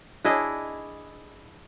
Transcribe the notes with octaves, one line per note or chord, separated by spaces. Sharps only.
D4 E4 G#4 D#5